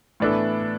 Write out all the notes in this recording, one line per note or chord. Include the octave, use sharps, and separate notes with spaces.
A2 E3 B3 D4 A4